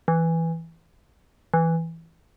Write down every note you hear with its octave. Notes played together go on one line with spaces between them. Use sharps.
E3
E3